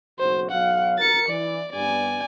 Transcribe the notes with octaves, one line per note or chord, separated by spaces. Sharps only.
F#1 B1 F#4 C5
B1 F#3 F5 F#5
A#4 A6 C#7
E3 D5
G2 B3 D5 G#5